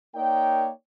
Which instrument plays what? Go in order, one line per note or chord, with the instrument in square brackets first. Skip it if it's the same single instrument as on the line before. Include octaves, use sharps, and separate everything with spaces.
[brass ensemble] A#3 D#4 A#4 C#5 D5 G5